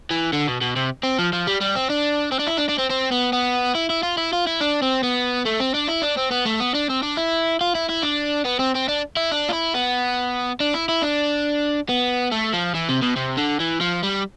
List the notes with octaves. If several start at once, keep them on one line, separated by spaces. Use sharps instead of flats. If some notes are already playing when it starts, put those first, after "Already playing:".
E3
D3
B2
B2
C3
C4
F3
F3
G3
G3
C4
D4
C4
D4
E4
D4
D4
C4
C4
B3
B3
E4
E4
F4
E4
F4
E4
D4
C4
B3
A3
C4
D4
E4
D4
C4
B3
A3
B3
D4
C4
D4
E4
F4
E4
E4
D4
B3
C4
C4
D4
E4
D4
F4
E4
B3
D4
E4
E4
D4
B3
A3
F3
E3
C3
B2
C3
D3
E3
F3
G3